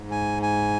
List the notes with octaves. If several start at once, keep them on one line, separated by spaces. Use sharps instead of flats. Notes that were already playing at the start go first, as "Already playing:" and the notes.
Already playing: G#2
G#5
G#5